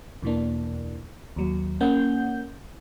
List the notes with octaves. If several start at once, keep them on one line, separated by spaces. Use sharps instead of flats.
E2 B2 E3 A#3 D4
D#2 F#3
A#3 C#4 F#5 G6